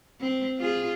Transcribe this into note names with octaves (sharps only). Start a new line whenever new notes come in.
C4
F4 G#4